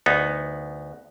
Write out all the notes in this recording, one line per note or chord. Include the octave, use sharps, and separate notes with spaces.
D2 B3 D#4